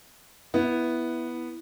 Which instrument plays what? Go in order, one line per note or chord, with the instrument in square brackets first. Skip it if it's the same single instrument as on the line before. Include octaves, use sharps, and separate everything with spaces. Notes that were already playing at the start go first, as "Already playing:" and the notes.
[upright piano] B3 [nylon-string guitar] E4